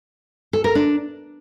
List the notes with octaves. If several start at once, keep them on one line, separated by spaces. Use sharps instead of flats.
A4
A#4
D4